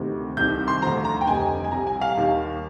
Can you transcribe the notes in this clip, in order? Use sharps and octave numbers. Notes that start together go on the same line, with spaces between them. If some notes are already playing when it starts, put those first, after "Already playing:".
Already playing: D2 C3 D#3
C2 C3 D#3 G6
C6
D2 D3 F3 A#5
A#5
G5
F1 F2 D3 G3 G#5
G#5
C2 C3 G3 A#5
G#5
F5
D#2 D#3 G3